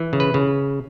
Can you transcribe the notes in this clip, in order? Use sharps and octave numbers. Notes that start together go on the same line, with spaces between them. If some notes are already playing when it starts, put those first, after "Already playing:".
Already playing: E3
C#3
B4
C#3